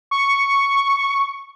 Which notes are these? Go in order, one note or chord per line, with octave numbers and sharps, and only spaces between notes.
C#6